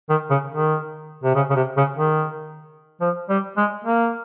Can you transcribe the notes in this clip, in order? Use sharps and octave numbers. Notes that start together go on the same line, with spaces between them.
D#3
C#3
D#3
C3
C#3
C#3
C3
C#3
D#3
F3
G3
G#3
A#3